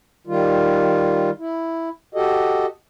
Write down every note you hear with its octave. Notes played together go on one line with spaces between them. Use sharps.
D#3 G3 F4
E4
F#4 G4 A4 D#5